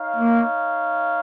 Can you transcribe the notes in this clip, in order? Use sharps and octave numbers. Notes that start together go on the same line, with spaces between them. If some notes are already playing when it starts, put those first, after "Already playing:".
Already playing: D#4 C#5 F5
A#3